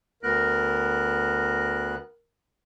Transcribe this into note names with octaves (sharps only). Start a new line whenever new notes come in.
D2 B3 A#4 F#6